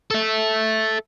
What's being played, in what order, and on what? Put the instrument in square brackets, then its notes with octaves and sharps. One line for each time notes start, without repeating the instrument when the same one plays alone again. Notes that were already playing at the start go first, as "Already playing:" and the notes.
[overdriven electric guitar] A4 E5